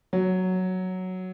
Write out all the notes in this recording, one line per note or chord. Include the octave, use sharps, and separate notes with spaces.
F#3